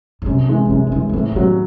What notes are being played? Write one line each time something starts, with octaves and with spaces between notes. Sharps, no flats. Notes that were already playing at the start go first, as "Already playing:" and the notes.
A2
F#2 C3
E3 G#3
C#3
F#2 C3
D#3
C#3 E3 G#3
F#3
A2 E3
C#3
D#3 F#3 C#4